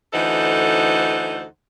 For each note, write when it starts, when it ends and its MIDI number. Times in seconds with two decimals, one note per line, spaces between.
0.12 1.43 38
0.12 1.43 52
0.12 1.43 63
0.12 1.43 69
0.12 1.43 72
0.12 1.43 78